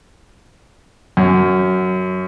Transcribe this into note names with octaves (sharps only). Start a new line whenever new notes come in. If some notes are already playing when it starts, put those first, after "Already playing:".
F#2